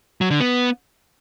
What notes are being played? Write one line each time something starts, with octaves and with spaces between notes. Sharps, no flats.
F#3
D3
B3